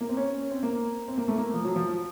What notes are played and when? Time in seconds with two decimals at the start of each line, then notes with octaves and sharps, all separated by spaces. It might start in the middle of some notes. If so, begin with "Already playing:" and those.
0.01 A#3
0.09 C4
0.17 C#4
0.51 C4
0.63 A#3
1.08 C4
1.18 A#3
1.28 A3
1.38 A#3
1.54 F3
1.65 F#3
1.76 F3